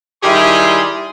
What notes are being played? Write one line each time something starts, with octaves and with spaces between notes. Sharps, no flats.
D#3 G3 E4 G4 G#4 C6